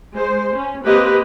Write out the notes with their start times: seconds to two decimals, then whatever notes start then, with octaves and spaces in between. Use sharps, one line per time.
0.15 G#3 C5
0.55 C#4
0.84 A#3 C4 G4 B4 D#5